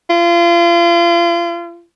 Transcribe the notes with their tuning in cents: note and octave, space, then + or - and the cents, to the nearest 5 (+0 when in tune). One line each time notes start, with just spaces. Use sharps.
F4 -35